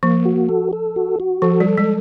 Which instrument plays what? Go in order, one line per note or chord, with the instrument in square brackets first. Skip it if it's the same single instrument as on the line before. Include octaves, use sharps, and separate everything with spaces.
[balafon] F3 [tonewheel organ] A#3
[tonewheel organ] F#4
A4
A4
F#4
F#4
[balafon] F3 [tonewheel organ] A4
[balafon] G3
[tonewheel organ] A4
[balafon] G#3